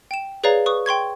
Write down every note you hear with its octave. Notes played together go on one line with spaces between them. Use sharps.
G5 E7
G#4 B4 C#5 D5 F5 A#5
B4 C#6 D#6
G5 C6 C#6 G#6